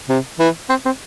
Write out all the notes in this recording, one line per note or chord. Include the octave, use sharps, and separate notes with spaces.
C3
E3
C4
C4